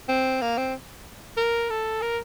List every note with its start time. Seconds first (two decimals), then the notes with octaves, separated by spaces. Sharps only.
0.09 C4
0.42 A#3
0.57 C4
1.37 A#4
1.70 A4
2.02 A#4